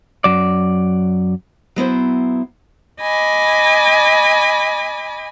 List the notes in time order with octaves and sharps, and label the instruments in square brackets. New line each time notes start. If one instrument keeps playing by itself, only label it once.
[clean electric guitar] F#2 F#3 D5
[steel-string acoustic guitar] F#3 B3 E4 C5
[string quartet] D#5 G#5 B5 D6